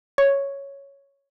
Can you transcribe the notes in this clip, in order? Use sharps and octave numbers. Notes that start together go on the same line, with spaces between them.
C#5